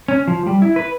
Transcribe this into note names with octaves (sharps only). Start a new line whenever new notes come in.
C#4
F3
G3
E4
B4